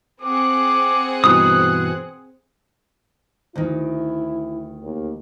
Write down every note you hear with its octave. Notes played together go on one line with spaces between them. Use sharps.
C4 G#4 F#5 D6
G2 B2 E3 D#6 F#6
D2 D#3 E4
D#2